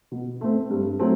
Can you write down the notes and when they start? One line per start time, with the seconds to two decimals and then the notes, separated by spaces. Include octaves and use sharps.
0.11 B2
0.41 A3 C4
0.70 G2
0.99 F#3 A3 C4